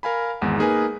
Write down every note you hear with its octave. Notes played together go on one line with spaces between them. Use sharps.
A#4 F5 G#5 B5
G#1 E2 G#3 F#5
A#3 D#4 G#4 A#4 B4 G#5